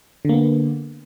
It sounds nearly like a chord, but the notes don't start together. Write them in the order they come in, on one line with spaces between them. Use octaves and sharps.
D3 A#3 B3